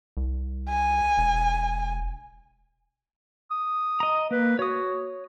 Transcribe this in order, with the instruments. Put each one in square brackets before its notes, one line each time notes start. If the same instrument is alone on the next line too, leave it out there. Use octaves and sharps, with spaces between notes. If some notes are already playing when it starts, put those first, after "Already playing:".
[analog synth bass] C2
[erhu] G#5
[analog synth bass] E1
[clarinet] D#6
[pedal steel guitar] D#5 A#5
[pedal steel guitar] A#3 [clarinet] B4
[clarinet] F#4 [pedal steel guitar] C#5 D#6